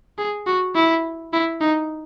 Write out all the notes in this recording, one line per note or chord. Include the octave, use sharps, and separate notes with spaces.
G#4
F#4
E4
E4
D#4